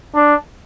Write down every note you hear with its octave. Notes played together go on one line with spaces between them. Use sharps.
D4